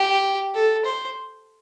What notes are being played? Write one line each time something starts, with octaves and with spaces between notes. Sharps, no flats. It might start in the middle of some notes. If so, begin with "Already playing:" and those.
Already playing: G4
A4
C5